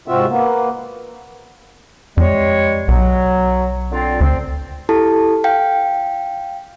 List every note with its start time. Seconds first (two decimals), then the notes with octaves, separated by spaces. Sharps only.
0.08 G#2 C3 C4 F4 F#4 E5
0.29 A#3 B3
2.17 F2 G3 G#3 C#5
2.88 B1 F#3
3.91 D3 C4 F4
4.21 D2 C4
4.89 E4 G4 A4 A5
5.44 F5 G5